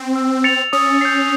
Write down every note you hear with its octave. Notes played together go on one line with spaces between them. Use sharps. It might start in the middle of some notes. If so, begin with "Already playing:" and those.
Already playing: C4
E6
A6 C#7 F7
C#4 D#6
G6 C7